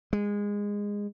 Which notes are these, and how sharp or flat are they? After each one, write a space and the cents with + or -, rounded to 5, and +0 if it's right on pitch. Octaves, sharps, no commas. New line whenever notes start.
G#3 -20